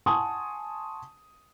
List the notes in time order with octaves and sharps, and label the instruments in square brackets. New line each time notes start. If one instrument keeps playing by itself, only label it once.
[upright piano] F#5 G#5 A5 C6 C#6 D#6